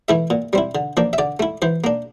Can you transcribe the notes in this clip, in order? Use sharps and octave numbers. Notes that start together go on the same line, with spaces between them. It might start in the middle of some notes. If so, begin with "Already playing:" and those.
E3 A3 E4 E5
A#2
G3 C4 E4
D3
F3 A#3 D4
E5
D3 D5
A3 E4
E3 C5
A#3 D4